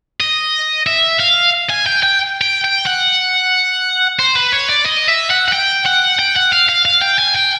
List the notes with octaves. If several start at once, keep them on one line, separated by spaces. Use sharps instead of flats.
D#5
E5
F5
G#5
G5
G5
G5
G5
F#5
C5
B4
C#5
D5
D#5
E5
F#5
F#5
G5
F#5
G5
F#5
F5
F5
F5
G5
G#5
G5